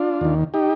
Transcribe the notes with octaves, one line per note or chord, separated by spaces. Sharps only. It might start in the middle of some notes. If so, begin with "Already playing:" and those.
Already playing: D4 F4
D#2 D#3
D#4 G4